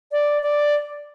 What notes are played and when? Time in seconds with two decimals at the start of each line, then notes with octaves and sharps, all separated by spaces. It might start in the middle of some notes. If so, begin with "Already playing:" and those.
0.12 D5
0.42 D5